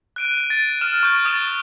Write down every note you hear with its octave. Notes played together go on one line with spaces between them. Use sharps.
F#6 D7 D#7
A6
F6 E7
C#6 G6
D#6 A6 E7 G7